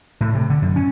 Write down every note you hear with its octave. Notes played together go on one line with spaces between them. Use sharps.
A2
C3
D3
F#2
C#4